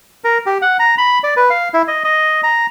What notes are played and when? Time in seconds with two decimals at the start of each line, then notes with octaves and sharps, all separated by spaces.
0.24 A#4
0.46 G4
0.62 F#5
0.79 A#5
0.98 B5
1.24 D5
1.37 B4
1.50 F5
1.73 E4
1.88 D#5
2.04 D#5
2.43 A#5